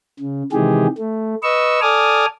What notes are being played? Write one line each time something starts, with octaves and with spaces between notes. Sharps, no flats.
C#3
C3 D#3 E3 G#3 G4 G#4
A3
B4 D#5 C#6 E6
A4 D5 G#5 D6 D#6 F6